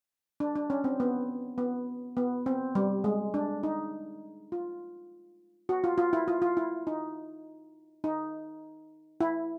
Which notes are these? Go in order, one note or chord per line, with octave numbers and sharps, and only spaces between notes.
D4
D4
C#4
C4
B3
B3
B3
C4
G3
G#3
D4
D#4
F4
F#4
F4
F4
E4
F4
F4
E4
D#4
D#4
E4